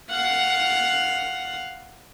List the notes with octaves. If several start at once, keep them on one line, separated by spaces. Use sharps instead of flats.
F5 F#5